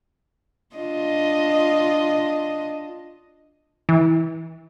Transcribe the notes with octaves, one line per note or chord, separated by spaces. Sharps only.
D4 F4 D#5
E3